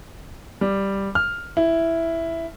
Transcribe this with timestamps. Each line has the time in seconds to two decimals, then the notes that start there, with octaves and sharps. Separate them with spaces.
0.61 G3
1.15 F6
1.57 E4